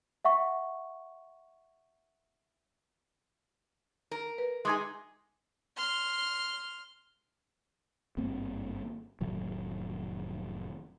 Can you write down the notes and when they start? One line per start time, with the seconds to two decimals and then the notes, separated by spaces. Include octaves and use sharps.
0.25 E5 F#5 C#6
4.11 A#4
4.38 B4
4.65 G#3 D#4 G#4 C6 D6 G#6
5.77 C6 F6
8.17 G#1 G2 A#3 C4
9.21 F1 A2 D#3 F#3